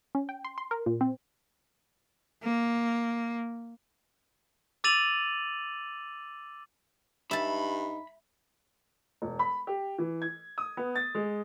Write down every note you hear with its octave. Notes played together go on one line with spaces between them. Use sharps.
C#4
G5
C6
C6
A#4
A#2
C4
A#3
D6 E6 A6 D#7 F7 F#7
G2 D#4 E5 A5 B5
E1
B5
G4
E3
G#6
D#6
B3
A6
G#3